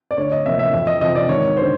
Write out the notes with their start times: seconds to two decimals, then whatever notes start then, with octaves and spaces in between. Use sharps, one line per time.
0.11 D5
0.17 D2 C#5
0.32 D#5
0.46 C3 F3 A#3 E5
0.59 E5
0.73 F2 E5
0.87 D#5
1.01 C3 F3 D#5
1.15 D5
1.29 G#1 C#5
1.57 D3 C5